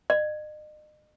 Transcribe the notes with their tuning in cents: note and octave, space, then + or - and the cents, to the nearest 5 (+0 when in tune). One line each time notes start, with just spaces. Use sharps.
D#5 -40